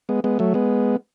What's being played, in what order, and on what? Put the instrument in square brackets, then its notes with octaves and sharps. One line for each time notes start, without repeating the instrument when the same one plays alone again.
[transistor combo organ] G#3 B3
G#3 B3
F#3 A3
G#3 B3